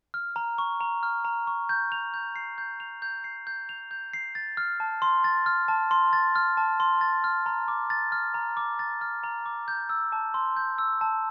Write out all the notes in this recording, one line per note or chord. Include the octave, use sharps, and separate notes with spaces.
F6
A#5
C#6
A#5
F6
A#5
C#6
G6
F7
G6
C7
G6
F7
G6
C7
G6
F7
G6
C7
A6
F6
A5
C6
A6
F6
A5
C6
A6
F6
A5
C6
A6
F6
A#5
D6
A6
F6
A#5
D6
A6
F6
A#5
D6
G6
E6
A5
C6
G6
E6
A5